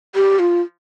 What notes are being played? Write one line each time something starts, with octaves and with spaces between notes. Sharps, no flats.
G4
F4